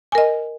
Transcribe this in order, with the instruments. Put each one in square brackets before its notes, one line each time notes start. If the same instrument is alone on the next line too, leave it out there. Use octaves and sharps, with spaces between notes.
[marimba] G#5
A#4
D#5